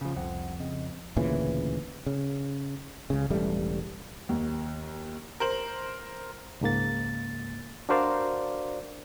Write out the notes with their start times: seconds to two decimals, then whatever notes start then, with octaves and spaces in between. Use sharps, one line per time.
0.01 C#3 F3
0.16 C2 F2 C5 F#5
0.60 C#3 C4 D#5
1.16 D2 A#2 C#3 E3
2.06 C#3
3.10 C#2 C#3
3.30 E1 A1 G3 A3
4.29 D#2
5.40 A#4 C5 F#7
6.61 C#2 G#2 A#3 A6
7.89 D4 F#4 A#4 C5 D5 F5